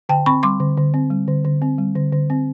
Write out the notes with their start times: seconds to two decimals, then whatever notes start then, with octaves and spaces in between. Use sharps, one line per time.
0.09 D3 G5 A5
0.26 C4 B5 C#6
0.43 G3 C6 D6
0.60 D3
0.77 D3
0.94 C4
1.10 G3
1.28 D3
1.45 D3
1.62 C4
1.78 G3
1.95 D3
2.12 D3
2.30 C4